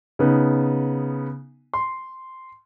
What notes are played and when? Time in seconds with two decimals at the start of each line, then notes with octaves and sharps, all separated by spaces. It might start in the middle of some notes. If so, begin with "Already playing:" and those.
0.19 C#3 B3 D#4
1.74 C6